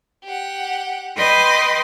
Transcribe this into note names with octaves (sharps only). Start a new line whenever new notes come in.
G4 F#5
B4 D#5 G5 C6 D6